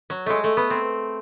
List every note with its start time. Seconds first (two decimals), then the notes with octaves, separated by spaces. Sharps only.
0.10 F#3
0.26 G#3 A3
0.44 A3
0.57 B3
0.70 C4